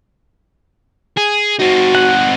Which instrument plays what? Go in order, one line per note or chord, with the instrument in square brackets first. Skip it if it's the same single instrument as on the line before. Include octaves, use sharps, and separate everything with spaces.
[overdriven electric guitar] G#4
[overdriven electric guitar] C4 D#4 [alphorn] F#4
[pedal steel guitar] F#5